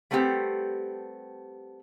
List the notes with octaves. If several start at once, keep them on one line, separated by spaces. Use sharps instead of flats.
G3 A3 B3 C4 G4